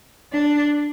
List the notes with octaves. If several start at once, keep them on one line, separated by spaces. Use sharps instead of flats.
D4